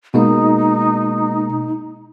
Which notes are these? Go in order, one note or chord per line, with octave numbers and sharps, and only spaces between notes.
B2 G#3 A#3 D#4